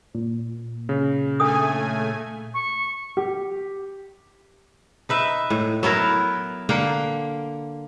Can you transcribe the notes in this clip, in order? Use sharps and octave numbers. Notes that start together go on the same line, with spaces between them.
A#2
C#3
A3 D4 A4 G#5 D#6
C#6
G4
D#4 B4 E5
A2
F#3 B3 E4 A#4
D3 A#3 F#5 G5